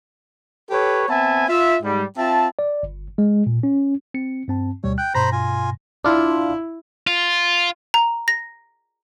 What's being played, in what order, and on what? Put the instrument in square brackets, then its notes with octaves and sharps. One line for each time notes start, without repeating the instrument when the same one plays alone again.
[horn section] G4 A4 B4 C#5
B3 C4 E5 G#5 A5
F4 E5
G#2 G3
C4 F4 E5 A5
[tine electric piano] D5
G1
G#3
A#2
C#4
C4 C#7
G2 C4 A5
[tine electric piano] D2 B2 G3 [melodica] C#5
[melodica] G5 [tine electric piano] F#6
[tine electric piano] G2 B2 A#6 [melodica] C5 A#5 B5
[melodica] F4 G#5
[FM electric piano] D4 F4 [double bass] E4
[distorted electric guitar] F4
[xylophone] A#5
A#6